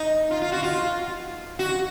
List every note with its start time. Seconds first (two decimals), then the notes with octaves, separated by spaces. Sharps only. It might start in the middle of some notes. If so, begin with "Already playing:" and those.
Already playing: D#4
0.31 F4
0.42 F4
0.52 F#4
0.63 F4
1.59 F#4